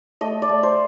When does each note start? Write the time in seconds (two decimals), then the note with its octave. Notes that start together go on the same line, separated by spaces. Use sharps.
0.21 A3 D#5
0.42 D5
0.49 A3
0.63 C5